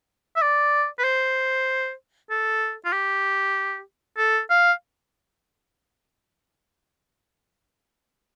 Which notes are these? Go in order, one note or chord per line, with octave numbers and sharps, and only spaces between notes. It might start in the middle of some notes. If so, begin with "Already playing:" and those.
E5
D5
B4
C5
A4
F4
G4
A4
F5